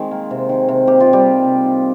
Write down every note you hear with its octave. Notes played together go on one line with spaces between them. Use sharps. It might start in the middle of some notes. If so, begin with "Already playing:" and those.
Already playing: D#3 G#3 C4 C5
A#3
C3
D#3
C3
A#3 G4
F4
C3
G3 G4
D#3
C3
D#3